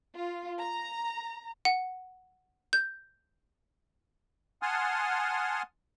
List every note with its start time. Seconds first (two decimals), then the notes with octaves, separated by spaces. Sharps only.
0.14 F4
0.60 A#5
1.65 F#5
2.73 G6
4.62 F#5 G#5 A5 C6 D#6 F6